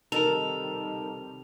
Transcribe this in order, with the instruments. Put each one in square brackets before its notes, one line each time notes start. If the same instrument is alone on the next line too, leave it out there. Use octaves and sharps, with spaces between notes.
[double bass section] C3 D#3 G3 [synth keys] D#4 A#4 [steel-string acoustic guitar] A4 [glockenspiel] F7